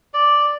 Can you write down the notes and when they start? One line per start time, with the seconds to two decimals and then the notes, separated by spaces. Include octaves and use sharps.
0.14 D5